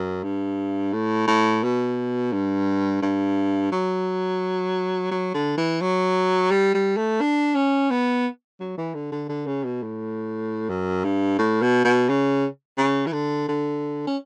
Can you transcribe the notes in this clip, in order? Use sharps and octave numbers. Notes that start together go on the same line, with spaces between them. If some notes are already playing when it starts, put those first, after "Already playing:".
Already playing: F#2
G2
A2
A2
B2
G2
G2
F#3
F#3
D3
E3
F#3
G3
G3
A3
D4
C#4
B3
F#3
E3
D3
D3
D3
C#3
B2
A2
F#2
G2
A2
B2
B2
C#3
C#3
E3
D3
D3
C#4